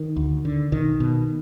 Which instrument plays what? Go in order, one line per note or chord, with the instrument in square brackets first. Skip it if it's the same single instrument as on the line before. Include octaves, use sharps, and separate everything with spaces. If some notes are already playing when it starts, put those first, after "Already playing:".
Already playing: [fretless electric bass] D#3
D2
D3
B1 D#3
B2